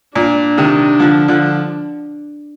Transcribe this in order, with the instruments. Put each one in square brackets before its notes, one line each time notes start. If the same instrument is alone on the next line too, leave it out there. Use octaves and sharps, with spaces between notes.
[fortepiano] A#2 [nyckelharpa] D4
[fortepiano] C3 D#3
D3 F3
D3 F3